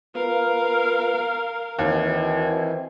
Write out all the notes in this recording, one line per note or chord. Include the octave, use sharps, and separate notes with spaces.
B3 F4 A#4 B4 F5
D#2 D#3 E3 C4 E4 F#4 G#5